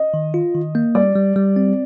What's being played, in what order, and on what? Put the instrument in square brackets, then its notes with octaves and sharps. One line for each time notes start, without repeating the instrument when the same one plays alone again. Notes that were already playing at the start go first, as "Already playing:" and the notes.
Already playing: [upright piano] D#5
[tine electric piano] D#3
F4
D#3
A#3
[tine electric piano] G3 [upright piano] D5
[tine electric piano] G3
G3
C4